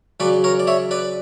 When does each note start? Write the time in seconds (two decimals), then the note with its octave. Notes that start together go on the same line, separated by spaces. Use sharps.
0.20 C#3 F#3 B4 D5
0.44 A#4 C#5
0.60 D5
0.67 C#5 E5
0.91 B4 D5